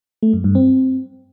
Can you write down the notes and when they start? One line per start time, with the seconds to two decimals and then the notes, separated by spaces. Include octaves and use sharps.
0.23 A3
0.33 F#2
0.44 G2
0.55 C4